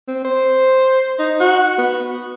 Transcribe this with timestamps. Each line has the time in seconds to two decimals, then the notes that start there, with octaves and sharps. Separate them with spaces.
0.08 C4
0.25 C5
1.19 D#4
1.40 F#4
1.78 B3